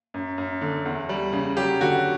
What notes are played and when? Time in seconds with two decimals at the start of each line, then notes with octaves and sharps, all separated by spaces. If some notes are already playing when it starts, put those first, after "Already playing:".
0.14 F#2
0.38 F#2
0.61 D3
0.85 E2
1.09 G3
1.33 C#3
1.57 F#3 G4
1.81 D3 F#4